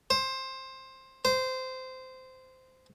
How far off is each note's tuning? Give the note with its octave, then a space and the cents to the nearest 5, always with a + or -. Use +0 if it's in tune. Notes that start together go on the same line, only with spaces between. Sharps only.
C5 +15
C5 -15